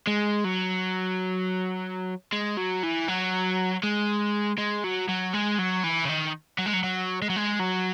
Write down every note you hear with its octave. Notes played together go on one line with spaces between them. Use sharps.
G#3
F#3
G#3
F#3
E3
F#3
G#3
G#3
F#3
F#3
G#3
F#3
E3
C#3
D#3
F#3
G#3
F#3
F#3
G#3
F#3
G#3
F#3